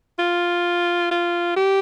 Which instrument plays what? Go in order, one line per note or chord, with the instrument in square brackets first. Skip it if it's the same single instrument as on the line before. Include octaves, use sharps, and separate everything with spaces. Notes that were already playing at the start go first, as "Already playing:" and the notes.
[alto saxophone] F4
F4
G4